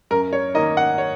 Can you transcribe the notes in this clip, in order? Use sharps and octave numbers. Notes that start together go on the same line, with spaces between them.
F#2 A#4
C#5
D#3 A#3 D#4 D#5
F#5
C#5